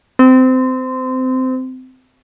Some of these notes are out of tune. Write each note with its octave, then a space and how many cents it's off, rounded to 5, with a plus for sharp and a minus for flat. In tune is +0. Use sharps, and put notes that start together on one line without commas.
C4 -25